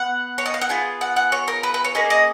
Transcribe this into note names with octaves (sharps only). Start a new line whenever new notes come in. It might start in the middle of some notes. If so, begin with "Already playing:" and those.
Already playing: B3 F#5
C#5
D#5
F5
F#5
B3 F4 G#4 G#5
F#5
F#5
C#5
A#4
B4
B4
C#5
A#3 C#4 G#4 D#5
D#5